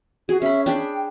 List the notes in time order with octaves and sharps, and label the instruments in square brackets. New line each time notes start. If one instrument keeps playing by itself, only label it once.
[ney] F#4 [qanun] G#4
[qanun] C#4 B5 [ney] E5
[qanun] D4 G#4 B5 [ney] G5